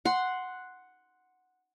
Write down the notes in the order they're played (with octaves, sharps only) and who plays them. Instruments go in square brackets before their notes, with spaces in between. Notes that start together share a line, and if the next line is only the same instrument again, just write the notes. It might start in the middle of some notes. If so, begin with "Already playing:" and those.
[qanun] F#5 C6